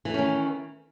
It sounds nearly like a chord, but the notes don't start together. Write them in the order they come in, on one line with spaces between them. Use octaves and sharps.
E3 A3 C#4 D#3